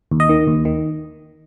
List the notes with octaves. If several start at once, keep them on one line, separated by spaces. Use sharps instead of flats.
D#2
D#5
D#3
D#2
D#3